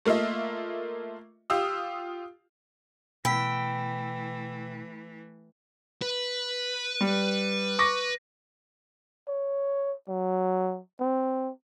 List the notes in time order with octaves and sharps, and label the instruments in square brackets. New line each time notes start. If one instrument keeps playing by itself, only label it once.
[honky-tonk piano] A3 A#3 F4 D#5 E5
F4 G4 F5 D#6 E6
[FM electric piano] B2 [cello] E3 A3 [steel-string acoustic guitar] G5 [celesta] B5 E6 B6
[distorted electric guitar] B4
[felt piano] G3
C#6 D6 A#6
[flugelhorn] C#5
F#3
C4